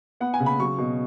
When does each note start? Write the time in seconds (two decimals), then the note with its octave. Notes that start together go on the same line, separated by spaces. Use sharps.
0.21 B3 F#5
0.34 G#5
0.40 C#3
0.46 B5
0.59 F#3 C#6
0.78 B2